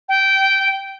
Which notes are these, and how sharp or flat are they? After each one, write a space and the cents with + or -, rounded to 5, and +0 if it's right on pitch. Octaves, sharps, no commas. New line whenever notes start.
G5 -15